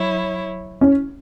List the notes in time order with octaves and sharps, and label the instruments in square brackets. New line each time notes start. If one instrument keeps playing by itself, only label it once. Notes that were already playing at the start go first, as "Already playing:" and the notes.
Already playing: [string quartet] F#3 E4 C#5
[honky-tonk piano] C#4